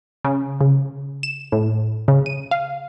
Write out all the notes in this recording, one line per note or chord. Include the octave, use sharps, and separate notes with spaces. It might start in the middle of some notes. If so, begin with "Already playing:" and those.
C#3
C#3
E7
A2
C#3
D#7
F5